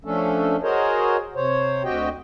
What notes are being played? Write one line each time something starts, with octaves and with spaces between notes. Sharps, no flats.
F3 A3 C#4 D4 A4
F#4 G#4 A#4 C5 C#5 D#5
C3 C5 C#5
D2 C4 F#4 G4 D#5 G5